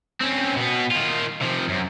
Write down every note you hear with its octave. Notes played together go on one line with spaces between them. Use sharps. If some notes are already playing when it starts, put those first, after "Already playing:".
C4 C#4
B2 B3
D#3 F4
C3 F3
F#2